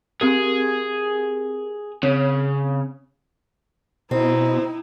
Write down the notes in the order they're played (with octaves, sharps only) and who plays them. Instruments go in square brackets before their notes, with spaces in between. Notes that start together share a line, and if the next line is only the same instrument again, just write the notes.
[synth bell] C4 G4 A#4 [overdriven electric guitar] G#4
[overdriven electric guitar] C#3 [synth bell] C4 C#5
[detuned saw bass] B2 [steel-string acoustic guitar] C4 [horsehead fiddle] D#4 E4